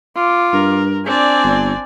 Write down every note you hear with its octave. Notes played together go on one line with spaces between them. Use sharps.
F4 D6
G2 A#4
C4 D4 D5 G#5
G1